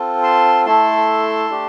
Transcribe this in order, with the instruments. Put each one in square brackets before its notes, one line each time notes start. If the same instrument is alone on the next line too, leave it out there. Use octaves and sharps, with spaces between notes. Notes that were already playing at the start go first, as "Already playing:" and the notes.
Already playing: [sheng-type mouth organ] C4 F4 A4
A5 C6
A3 E4 A4 A5 C6
A3 D4 G4